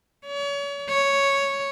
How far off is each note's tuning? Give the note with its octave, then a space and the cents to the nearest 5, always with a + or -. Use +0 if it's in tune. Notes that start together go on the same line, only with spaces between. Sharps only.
C#5 +35
C#5 +0